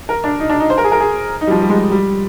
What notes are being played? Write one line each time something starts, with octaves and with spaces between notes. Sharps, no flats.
A#4
D4
D#4
D4
D#4
C5
A#4
G#4
A#4
G#4
D#4
G3
F3
G3
G#3
G3
G3